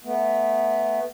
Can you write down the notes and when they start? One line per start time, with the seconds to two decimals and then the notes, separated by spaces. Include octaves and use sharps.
0.05 A3 B3